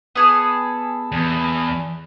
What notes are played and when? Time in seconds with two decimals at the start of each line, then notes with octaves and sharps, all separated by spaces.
0.15 B3 G#4 A4
1.12 E2